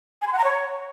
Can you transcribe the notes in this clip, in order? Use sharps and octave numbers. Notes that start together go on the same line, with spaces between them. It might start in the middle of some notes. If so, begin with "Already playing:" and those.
G#5
C6
F#5
A#5
C#5